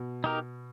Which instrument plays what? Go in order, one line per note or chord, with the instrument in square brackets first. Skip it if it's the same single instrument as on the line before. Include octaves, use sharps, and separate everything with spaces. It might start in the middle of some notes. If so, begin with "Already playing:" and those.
Already playing: [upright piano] B2
[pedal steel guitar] D#4 G4 A#4